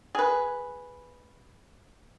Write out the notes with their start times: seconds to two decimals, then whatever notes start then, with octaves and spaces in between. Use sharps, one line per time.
0.15 G#4 B4